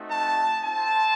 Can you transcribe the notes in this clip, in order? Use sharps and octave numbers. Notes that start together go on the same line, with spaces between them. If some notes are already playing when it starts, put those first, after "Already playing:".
Already playing: A3 C4 D#4 F#4
A5
C4 F4 A5